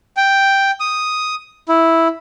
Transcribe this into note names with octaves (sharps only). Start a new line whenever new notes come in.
G5
D#6
E4